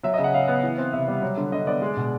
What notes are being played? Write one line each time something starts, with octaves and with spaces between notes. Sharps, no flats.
F#3 E5
C#3 D#5
F#5
C#3 F5
B3
E3
C4
C3 E5
G3
F#3
D3
D3 D#5
B3 D5
G#3
B2